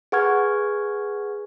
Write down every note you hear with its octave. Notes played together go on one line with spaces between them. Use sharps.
G#4 B4 F#5 C#6 F6 G#6